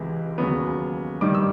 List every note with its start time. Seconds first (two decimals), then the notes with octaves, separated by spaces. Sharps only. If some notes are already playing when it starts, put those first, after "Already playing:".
Already playing: C#2 C3 E3 G#3
0.38 D#2 C#3 F#3 B3
1.21 G2 D#3 G3 D6
1.35 E6